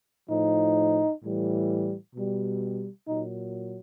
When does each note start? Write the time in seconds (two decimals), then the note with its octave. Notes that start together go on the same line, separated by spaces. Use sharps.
0.30 A2 F3 D#4
1.23 A2 E3 G3
2.15 B2 G3
3.08 A#2 F#3 D#4